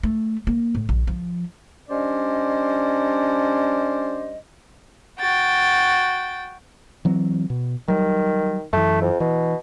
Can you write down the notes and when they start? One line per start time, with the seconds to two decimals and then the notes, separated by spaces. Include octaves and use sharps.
0.03 A3
0.47 A#3
0.75 A2
0.89 A#1
1.07 F3
1.89 G3 C#4 D4 C5 D5 D#5
5.18 F#4 G5 A6
7.05 E3 F#3 C4
7.50 B2
7.88 D#3 F#3 G3
8.73 F#2 E3 A3
9.02 F2
9.20 B2 E3